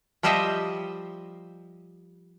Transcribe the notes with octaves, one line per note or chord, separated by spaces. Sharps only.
F3 G3 G4 C5 D#5 E5